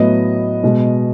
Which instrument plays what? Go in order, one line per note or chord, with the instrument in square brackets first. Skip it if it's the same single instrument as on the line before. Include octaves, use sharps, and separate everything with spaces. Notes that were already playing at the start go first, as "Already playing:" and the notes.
Already playing: [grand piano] A2 F#3 B3 D#5
B2 G#3 B3